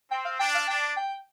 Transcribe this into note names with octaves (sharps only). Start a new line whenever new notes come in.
C4 G5
F5
D4 G5
F5
D4 G5
G5